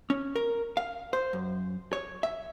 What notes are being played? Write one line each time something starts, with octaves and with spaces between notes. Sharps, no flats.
C#4
A#4
F5
C5
F#2
C#5
E5